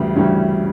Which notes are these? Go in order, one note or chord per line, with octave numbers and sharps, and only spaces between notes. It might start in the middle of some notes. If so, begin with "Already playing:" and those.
Already playing: D2 C#3 E3 G3 E4
D2 C#3 E3 G3 C#4